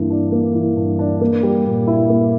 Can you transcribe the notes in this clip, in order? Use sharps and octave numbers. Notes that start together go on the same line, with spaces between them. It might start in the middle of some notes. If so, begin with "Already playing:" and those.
Already playing: G2 E3 A#3
D4
A#3
E3
G2
D4
A#3
G3
A#2
E4
A#3